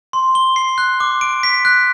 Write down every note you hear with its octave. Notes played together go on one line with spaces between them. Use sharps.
C6
G7
C7
F#6
D6
D7
B6
F#6